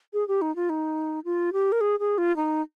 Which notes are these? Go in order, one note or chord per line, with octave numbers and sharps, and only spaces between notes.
G#4
G4
D#4
F4
D#4
F4
G4
A#4
G#4
G#4
F4
D#4